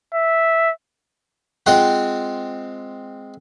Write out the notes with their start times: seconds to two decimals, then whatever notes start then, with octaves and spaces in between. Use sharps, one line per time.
0.14 E5
1.66 G#3 C4 F4 F#5 G5